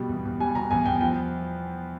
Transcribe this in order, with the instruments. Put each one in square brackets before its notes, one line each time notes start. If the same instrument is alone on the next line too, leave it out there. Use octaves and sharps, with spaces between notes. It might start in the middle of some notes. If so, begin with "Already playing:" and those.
Already playing: [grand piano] B2 G3
E2
E2
G3 G#5
B2 A#5
E2 G#5
E2 G5
F3 G5